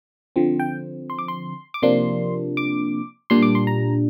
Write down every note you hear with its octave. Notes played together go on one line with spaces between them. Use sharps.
D3 F3 C4
G5
C6
D6
C6
D6
C3 F3 A#3 D4 C6
D6
A#2 G3 D4 C6
D6
C6
A#5